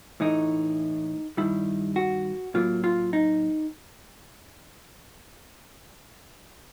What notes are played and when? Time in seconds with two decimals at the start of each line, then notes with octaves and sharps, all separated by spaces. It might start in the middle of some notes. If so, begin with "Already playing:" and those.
0.20 A2 E3 A3 D#4
1.37 G2 D#3 G3 E4
1.96 F#4
2.54 A2 F#3 A#3 F4
2.84 F4
3.13 D#4